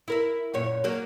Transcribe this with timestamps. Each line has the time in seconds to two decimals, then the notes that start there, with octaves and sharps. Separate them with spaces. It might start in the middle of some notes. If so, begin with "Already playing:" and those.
0.08 E4 A#4 E5
0.54 F#2 A#2 C#5
0.84 F#3 A#3 F#4